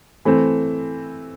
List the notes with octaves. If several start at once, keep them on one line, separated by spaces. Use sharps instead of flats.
E3 A3 C4